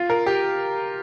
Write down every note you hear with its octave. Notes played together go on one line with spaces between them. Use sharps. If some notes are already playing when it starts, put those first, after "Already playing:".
Already playing: F4
A#4
G4